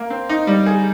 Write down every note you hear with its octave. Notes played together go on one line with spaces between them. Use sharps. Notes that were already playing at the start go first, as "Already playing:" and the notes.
Already playing: A#3
C4
D#4
G3
G#4